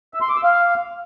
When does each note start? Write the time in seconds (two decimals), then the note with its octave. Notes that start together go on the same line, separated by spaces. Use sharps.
0.14 E5
0.21 C6
0.29 D6
0.36 E6
0.44 F5